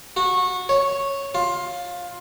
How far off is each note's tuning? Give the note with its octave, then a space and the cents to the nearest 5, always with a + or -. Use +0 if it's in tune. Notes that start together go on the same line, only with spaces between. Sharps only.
F#4 -20
C#5 -5
F4 +15